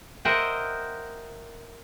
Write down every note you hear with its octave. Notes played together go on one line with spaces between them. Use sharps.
A#4 C5 D#5 E5 F#5 G5